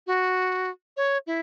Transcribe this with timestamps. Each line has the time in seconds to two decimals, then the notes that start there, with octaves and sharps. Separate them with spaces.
0.07 F#4
0.97 C#5
1.27 E4